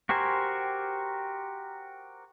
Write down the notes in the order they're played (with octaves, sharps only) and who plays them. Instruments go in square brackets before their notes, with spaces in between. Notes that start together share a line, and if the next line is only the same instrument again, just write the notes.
[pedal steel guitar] F#4 G4 A#4 C5 G#5